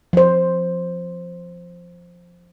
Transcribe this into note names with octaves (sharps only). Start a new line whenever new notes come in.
F3 C5